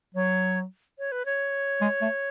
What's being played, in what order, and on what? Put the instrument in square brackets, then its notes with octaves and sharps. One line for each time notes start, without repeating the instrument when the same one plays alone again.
[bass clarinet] F#3 [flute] C#5
[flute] C#5
B4
C#5
[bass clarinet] G#3
A3